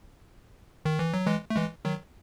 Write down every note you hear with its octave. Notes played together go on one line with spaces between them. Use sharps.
D#3
E3
F#3
E3 G#3
A3
E3 G#3
D#3 F#3